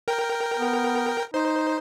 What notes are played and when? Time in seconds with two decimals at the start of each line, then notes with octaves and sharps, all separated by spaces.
0.08 A#4 G5
0.58 B3
1.34 D#4 C5